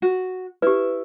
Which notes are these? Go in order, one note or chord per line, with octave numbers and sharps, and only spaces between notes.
F#4
E4 G4 B4